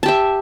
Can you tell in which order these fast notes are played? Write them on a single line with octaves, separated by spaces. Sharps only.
A5 G4 E5